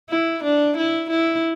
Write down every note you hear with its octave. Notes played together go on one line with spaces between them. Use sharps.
E4
D4
E4
E4